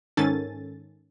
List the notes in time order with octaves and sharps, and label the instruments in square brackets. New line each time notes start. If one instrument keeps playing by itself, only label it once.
[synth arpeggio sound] G#2 D#3 C#4 A4 G#5 A6